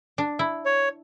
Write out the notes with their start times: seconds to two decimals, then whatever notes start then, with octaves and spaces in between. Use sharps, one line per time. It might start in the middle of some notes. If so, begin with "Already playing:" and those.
0.18 D4
0.39 E4
0.65 C#5